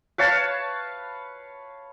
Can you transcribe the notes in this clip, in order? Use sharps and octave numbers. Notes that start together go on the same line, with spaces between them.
B4 C#5 F5 A5